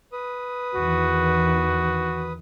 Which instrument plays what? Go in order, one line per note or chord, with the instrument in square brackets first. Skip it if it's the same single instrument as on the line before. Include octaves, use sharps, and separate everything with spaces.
[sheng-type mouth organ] B4 D#6
[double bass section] E2 D#3 E3 [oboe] F#4